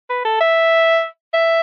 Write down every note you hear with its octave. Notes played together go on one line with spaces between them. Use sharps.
B4
A4
E5
E5